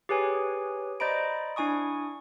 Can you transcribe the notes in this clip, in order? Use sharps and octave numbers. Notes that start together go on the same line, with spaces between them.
G4 G#4 B4 C#5 G#5
C5 D5 D#5 A#5 B5 D7
D4 E4 G#5 C#6 D#6